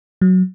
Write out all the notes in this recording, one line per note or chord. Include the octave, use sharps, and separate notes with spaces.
F#3